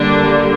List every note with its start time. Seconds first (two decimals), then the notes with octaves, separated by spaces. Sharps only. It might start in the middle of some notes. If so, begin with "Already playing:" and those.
Already playing: D3 G3 A#3 D4